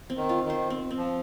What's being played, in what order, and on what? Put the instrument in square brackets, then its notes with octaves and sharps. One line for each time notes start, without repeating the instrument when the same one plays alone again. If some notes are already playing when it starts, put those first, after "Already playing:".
[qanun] C4
[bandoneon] D#3
[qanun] F4
[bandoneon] D#3
[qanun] C5
C4
C4
[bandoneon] F3